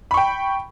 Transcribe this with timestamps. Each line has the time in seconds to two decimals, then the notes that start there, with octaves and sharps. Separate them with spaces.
0.11 B5
0.14 C#6
0.17 G5